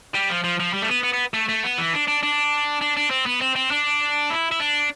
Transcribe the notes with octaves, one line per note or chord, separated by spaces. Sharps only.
G3
F3
F3
F3
G3
A3
B3
B3
B3
A3
A3
B3
E3
D4
D4
D4
D4
D4
C4
B3
C4
C4
D4
E4
E4
D4